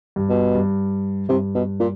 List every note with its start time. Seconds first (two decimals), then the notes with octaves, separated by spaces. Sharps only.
0.16 G2
0.29 B2
0.54 G2
1.29 G2 C3
1.55 B2
1.79 A#2